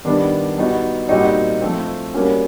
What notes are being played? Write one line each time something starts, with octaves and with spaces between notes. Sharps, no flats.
D#3 G3 B3 D4
G3 B3 D#4 F#4
A#2 G3 C4 D#4 F#4
F3 A3 C4
G3 A#3 C#4 F#4